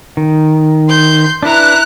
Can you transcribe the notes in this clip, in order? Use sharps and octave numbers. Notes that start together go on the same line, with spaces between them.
D#3
C6 G6
D4 E4 B4 A#5 F#6